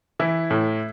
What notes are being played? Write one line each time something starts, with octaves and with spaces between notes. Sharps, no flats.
E3 E4
A2